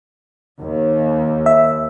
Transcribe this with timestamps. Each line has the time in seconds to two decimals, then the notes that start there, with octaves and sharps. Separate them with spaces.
0.59 D#2
1.46 E5